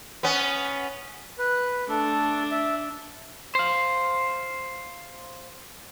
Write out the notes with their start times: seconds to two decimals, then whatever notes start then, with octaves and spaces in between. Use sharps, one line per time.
0.23 B3 C#4
1.38 B4
1.88 A3 D4 A4
2.51 E5
3.55 C5 F5